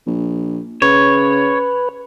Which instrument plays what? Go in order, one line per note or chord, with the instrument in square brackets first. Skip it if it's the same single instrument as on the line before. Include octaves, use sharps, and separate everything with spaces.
[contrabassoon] A#1
[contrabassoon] C#3 [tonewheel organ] B4 [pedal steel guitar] C#5